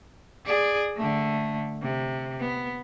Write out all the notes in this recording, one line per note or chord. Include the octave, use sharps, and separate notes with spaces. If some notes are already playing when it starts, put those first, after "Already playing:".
G#4 D5
D3 A3
C3
B3